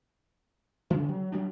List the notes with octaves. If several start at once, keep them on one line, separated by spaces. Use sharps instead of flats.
C#3 E3
F#3
F#3 G3 D4